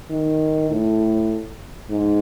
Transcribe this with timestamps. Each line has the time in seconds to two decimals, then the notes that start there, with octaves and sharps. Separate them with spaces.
0.10 D#3
0.70 A2
1.90 G#2